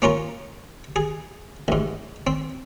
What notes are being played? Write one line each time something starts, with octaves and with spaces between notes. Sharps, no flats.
A#3 C#4 F4 A#4
G#4
A1 G#2
C4